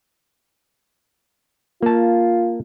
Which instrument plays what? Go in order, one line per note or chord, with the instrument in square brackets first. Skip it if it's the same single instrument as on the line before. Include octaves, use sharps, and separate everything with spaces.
[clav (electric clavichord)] A#3 A5 [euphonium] F4